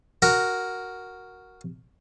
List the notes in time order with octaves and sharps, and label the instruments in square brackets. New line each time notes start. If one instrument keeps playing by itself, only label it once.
[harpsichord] F#4 A#4